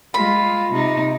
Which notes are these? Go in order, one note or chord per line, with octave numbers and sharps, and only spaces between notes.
G#3 F4 B5
C3 D#4